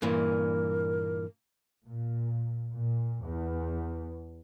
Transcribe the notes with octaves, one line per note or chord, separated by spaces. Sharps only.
G2 A#2 E3 A#4
A#2
A#2
E2